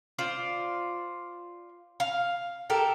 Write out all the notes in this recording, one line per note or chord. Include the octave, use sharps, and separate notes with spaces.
F4 C5 D5
F5
G4 A4 A#4